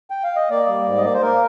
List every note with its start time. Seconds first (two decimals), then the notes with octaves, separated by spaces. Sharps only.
0.10 G5
0.24 F5
0.36 D#5
0.50 A#3 D5
0.68 G3
0.86 G#2
0.97 D#5
1.04 A#3 D5
1.14 C5
1.22 A#3 A#4